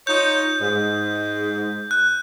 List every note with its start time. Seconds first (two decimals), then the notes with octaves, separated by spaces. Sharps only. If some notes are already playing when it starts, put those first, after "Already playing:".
0.07 D#4 F4 C#5 G6
0.61 G#2
1.91 F#6